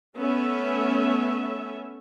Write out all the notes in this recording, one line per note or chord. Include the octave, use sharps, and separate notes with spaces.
A3 B3 C#4 A4 E5